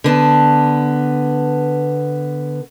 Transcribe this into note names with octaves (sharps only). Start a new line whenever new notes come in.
D3 B3 A5